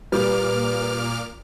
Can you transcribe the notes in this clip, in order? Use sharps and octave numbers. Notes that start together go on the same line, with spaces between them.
A#2 G3 B4 D6 F6